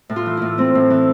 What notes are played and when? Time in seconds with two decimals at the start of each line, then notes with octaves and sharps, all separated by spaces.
0.09 A2
0.16 F4
0.26 E3
0.37 A2 E4
0.58 A3 C4
0.75 A2
0.90 E3